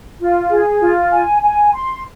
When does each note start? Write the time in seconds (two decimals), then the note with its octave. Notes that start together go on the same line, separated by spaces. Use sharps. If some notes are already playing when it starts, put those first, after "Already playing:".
0.20 F4
0.50 G#4
0.81 F4
1.12 G#5
1.43 G#5
1.73 C6